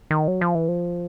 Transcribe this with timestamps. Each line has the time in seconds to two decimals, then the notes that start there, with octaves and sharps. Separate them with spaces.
0.11 D#3
0.28 F#3
0.41 F3
0.55 E3
0.68 F3